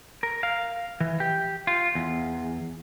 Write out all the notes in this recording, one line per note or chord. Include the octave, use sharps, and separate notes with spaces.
A#4
F5
E3
G4
F4
E2